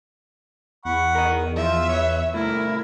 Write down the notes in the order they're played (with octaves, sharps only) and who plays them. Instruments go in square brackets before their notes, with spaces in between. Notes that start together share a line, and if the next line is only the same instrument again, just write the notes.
[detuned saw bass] E2 [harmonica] F#5 B5 C#6
[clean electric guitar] A#4 D#5
[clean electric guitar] F3 [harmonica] F4 [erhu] E5
[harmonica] B4 [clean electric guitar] C#5
[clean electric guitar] C2 A2 [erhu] E4 [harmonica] A#4